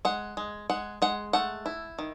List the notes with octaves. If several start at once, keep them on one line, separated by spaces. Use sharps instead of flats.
G#3 F#5
G#3
G#3 F#5
G#3 F#5
A3 F#5
E4
D#3